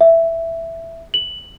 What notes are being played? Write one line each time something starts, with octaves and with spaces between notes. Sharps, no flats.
E5
F#7